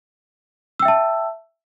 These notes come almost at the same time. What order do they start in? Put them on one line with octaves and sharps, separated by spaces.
E6 G5 E5 A5